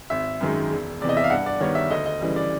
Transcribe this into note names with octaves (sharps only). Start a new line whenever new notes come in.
G#1 E5
F#2 D#3 G#3
E1
E2 C3 D5
D#5
E5
F5
G2 F#5
D5
D#3 G3 B3 C#5
E5
D2 D#5
D#5
C#3 E3 G3
D5